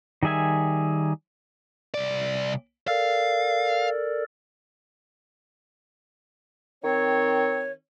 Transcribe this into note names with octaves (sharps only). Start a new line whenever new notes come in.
D#3 G3 G#4 E5 G#5
C2 D5
A4 A#4 D5 F5
D#3 C4 C#5